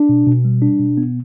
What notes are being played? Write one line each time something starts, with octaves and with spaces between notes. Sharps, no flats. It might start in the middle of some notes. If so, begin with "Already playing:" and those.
Already playing: D4
B2
B2
G3
D4
B2
B3